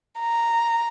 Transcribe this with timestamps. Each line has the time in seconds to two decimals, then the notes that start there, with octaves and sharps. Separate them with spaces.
0.19 A#5